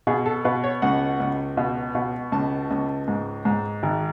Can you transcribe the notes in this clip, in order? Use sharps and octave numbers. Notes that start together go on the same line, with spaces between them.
B2 G#4
A4
B2 B4
C#5
C#2 F#5
C#2
B2
B2
C#2 A5
C#2
G#2
G#2
G#1